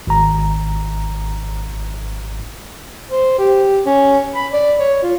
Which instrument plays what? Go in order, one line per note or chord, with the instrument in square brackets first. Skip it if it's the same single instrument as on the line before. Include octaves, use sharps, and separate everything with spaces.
[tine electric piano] G#1 A#5
[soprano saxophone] C5
G4
C#4
B5
D5
C#5
F4